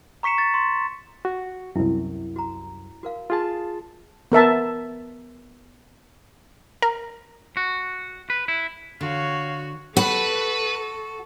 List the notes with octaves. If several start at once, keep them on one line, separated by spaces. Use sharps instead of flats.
A#5 C#6 B6 C#7 E7
A6
C6
F#4
C2 F#2 E4
F#4 A#5
F#4 A#4 F5
F4 G#4 A5
B3 A#4 E5 A5
A#4
F#4
B4
E4
D3 F#4 C#5 F5
F#4 A4 B4 B5